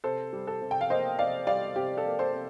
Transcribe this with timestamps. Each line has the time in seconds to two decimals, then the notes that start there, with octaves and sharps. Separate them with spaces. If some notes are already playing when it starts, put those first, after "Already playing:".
0.04 C3 A4 C5
0.33 G3
0.47 A4
0.61 C3
0.71 G5
0.81 F5
0.90 A#3 C5 D#5
1.19 C3 D5 F5
1.47 G3 D5 F5
1.76 C3 G4
1.97 A4
2.05 A#3
2.19 A4 C5
2.33 C3